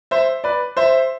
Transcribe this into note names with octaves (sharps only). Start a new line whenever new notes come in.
C5 E5
B4 D5
C5 E5